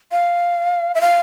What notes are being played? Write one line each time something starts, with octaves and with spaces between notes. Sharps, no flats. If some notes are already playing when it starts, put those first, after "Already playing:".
F5
E5
F5